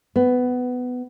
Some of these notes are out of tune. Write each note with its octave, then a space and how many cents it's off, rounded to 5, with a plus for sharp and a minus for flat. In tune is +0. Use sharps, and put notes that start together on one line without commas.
B3 +15